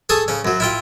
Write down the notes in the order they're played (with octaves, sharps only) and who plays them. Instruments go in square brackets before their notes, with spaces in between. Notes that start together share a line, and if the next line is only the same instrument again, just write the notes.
[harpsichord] G#4 A4 C#6 D#6
C#3 C#4
F#2 F#3
E4 F4 G5